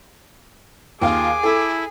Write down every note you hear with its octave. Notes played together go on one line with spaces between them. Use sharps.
D#2 F4 G#4 F5 D6
E4 A4